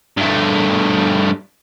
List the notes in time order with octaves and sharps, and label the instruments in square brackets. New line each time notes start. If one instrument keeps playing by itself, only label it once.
[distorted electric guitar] G2 A3